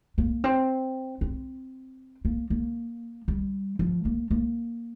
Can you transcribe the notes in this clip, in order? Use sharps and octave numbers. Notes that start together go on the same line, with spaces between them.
A#3
C4
C4
A#3
A#3
G3
F3
A#3
A#3